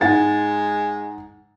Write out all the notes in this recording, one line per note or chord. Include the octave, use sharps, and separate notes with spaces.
G#2 G#3 F#5 A6